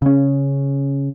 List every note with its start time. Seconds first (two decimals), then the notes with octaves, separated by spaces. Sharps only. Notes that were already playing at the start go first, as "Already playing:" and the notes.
0.02 C#3 C#4